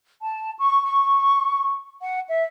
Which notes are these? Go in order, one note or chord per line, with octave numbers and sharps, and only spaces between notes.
A5
C#6
C#6
F#5
E5